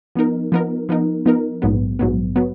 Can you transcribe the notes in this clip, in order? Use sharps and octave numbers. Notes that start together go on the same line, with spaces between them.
F3 B3 D#4 A#4
F3 B3 D#4 A#4
F3 B3 D#4 A#4
F3 B3 D#4 A#4
A#1 G#2 F#3 B3
A#1 G#2 F#3 B3
F#3 B3